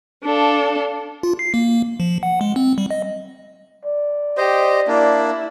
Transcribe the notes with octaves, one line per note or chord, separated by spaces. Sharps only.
D4 A4 F5
F4
C7
A#3
F3
F#5
G#3
C4
G3
D#5
D5
G4 C5 D#5
A#3 D4 E4